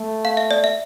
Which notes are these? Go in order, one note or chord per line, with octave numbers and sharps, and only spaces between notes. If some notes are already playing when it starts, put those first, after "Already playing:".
Already playing: A3
F5
E5
D5
E5